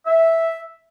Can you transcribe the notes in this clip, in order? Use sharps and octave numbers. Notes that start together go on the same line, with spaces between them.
E5